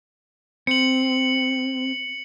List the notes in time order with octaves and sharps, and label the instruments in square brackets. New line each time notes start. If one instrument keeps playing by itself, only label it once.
[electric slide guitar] C4 [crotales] C#7 F#7